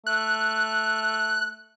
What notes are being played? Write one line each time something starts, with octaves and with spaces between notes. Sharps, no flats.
A3 F#6